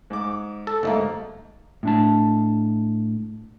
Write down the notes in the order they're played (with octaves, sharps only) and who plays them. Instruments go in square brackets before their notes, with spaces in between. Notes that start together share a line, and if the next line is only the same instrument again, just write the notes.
[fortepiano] G#2 D6
[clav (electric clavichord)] A4
[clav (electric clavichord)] G1 A3 D#4 [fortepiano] G#2 A#3
[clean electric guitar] A2 D4 A5